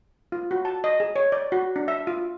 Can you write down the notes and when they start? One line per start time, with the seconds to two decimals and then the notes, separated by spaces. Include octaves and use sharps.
0.32 F4
0.51 F#4
0.65 A5
0.84 D#5
1.00 G#4
1.16 C#5
1.32 D5
1.52 F#4
1.76 D4
1.88 E5
2.07 F4